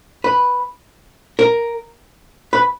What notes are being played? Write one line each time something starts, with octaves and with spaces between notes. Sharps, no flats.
B4
A#4
B4